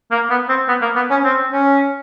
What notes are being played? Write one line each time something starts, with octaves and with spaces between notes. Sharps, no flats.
A#3
B3
C4
B3
A#3
B3
C#4
C4
C#4